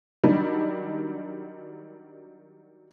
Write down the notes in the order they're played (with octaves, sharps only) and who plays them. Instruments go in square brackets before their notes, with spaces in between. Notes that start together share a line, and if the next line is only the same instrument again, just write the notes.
[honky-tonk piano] D#3 F#3 G3 D4 D#4